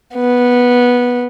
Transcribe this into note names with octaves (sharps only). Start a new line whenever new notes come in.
B3